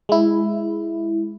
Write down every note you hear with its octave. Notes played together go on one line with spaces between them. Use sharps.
G#3 E4